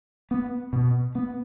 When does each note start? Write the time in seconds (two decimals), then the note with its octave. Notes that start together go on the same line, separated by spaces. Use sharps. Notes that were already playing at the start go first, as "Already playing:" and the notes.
0.31 B3
0.73 B2
1.15 B3